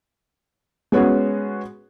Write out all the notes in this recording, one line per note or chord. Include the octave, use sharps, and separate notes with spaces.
G#3 B3 C#4 F#4 G#4